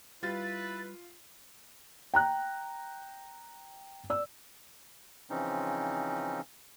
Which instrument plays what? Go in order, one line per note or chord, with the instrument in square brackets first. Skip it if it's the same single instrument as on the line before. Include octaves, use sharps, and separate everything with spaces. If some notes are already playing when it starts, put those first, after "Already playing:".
[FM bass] G3 [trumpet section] E4 B4 [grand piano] F4 [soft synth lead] A6
[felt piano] G5 A#5 F#6
D5 E6
[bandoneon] C#3 E3 F3 C4 C#4 D#4